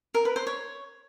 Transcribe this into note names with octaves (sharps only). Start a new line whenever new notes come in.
A#4
B4
C5
C#5